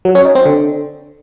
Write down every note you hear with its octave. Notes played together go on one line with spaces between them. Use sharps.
F#3
C#4
D#4
C4
D3